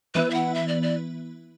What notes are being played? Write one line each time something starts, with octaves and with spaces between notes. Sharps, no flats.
E3 B3 E4 B4
E5
F#5
E5
D5
D5